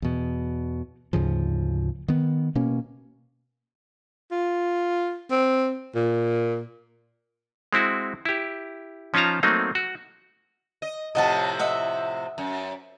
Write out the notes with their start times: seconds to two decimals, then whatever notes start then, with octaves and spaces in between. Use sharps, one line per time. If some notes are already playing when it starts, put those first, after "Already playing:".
0.02 E2 B2
1.13 D2 G#2 C#3 F3
2.08 D#3 B3
2.55 B2 A#3 C#4
4.31 F4
5.31 C4
5.95 A#2
7.73 G#3 C4 E4 F#4
8.25 E4 G4
9.14 F3 C#4 D#4 F4 A5 A#5
9.43 F#3 A3 A#3 C4 D#4
9.75 F#4
10.82 D#5
11.15 A2 C3 F3 D#5 F#5 A5
11.59 D#5 E5 F#5
12.38 F#2